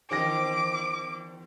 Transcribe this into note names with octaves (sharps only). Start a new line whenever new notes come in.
E2 D#3 G4 C5 D6 A#6